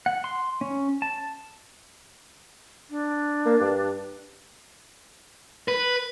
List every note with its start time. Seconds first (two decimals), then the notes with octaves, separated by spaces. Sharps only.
0.06 F#5
0.24 C6
0.61 C#4
1.02 A5
2.90 D4
3.46 A#3
3.60 G2
5.68 B4